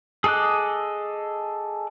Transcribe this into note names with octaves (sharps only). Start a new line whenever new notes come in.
G#4 A4 D#5 D6 F#6